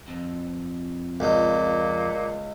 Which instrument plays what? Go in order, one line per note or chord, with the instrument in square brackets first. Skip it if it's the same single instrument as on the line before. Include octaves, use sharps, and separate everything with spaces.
[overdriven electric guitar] F2
[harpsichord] C#2 D#4 [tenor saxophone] A#2